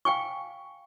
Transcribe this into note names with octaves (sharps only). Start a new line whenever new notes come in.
F5 G5 G#5 C#6